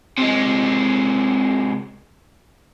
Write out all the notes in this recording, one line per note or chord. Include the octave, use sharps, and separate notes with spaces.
C3 G#3